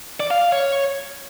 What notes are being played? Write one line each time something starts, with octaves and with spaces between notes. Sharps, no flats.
D5
F5
F5
C#5